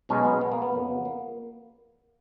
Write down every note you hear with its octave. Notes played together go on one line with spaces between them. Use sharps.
B1 B2 G#3 C#4
B3
B3
A#3
B3
F2 C#3 F#3
A#3